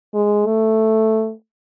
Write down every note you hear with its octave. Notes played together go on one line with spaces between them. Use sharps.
G#3
A3